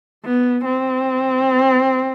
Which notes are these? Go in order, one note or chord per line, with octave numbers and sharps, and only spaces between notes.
B3
C4